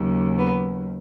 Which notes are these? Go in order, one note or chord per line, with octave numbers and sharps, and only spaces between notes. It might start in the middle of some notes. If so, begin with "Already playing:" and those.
Already playing: D#2 C#3 F#3
B3